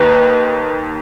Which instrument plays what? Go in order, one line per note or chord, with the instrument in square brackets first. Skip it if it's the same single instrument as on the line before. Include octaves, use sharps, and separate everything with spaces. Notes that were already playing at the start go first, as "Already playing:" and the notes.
Already playing: [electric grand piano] D#2 D#3 D#4 [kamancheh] B4